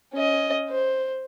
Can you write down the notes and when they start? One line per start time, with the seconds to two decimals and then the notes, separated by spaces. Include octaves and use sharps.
0.14 C#4 D#5
0.70 C5